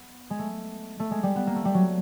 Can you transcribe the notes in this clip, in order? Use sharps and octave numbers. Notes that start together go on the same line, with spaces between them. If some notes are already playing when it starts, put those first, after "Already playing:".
Already playing: B3
G#3
A3
A3
G#3
G3
B3
A#3
A3
G3
F#3